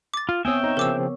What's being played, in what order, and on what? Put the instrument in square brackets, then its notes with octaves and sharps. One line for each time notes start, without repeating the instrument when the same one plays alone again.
[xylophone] D6 A6
[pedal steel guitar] F4
[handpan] B3 C4 C#5 [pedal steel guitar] E5 G5 [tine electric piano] G#5 D#6 E6
[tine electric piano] D#4 [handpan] C#5
[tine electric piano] C#3 F3 C4 [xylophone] A#4 D6 E6